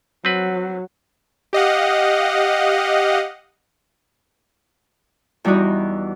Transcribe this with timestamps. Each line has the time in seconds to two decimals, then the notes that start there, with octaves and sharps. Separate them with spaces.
0.25 F#3 C4 B4
1.53 G4 D#5 F5 F#5
5.45 E2 G3 D#4 E4 F#4 D#5